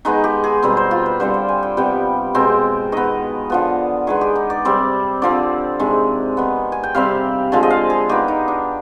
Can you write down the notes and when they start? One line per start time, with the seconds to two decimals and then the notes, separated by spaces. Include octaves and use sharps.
0.05 D#3 G#3 B3 D#4
0.24 G4
0.44 G#4
0.63 B2 G3 C4
0.77 C5
0.91 F4
1.06 B4
1.20 D3 G3 C4 C5
1.34 G5
1.48 G#5
1.63 G5
1.77 C3 G3 B3 G5
2.34 B2 G#3 C4 G5
2.92 D#3 B3 D#5
3.50 D3 F3 B3
4.07 D#3 G#3 B3 G#4
4.21 G4
4.36 D#4
4.50 D5
4.65 C3 G3 C4
5.22 D3 F3 C4 D5
5.79 C3 D#3 G#3
6.37 D#3 B3
6.72 G#5
6.83 G5
6.95 C3 G3 C4 F5
7.52 D3 F3 G#3
7.63 D#5
7.70 F5
7.90 G#4
8.09 D#3 B3 G4
8.28 D#4
8.48 D4